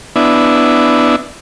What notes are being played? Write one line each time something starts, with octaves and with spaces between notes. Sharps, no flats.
B3 D4 E4